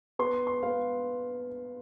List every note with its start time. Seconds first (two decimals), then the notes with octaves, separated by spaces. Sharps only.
0.19 B3 C6
0.47 C6
0.63 B3 F5